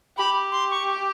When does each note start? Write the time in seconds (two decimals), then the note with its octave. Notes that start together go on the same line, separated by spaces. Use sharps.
0.17 G4 B5
0.52 C6
0.71 C#6